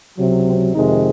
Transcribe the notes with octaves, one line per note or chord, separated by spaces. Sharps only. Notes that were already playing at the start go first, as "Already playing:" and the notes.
C#2 C3 F#3
C4
F2 C3 D#3 G#3 D#4